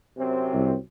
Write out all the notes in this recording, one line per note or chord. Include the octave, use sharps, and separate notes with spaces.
F#2 C3 C4
C2